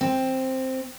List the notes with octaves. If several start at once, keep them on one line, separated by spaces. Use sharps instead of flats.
C4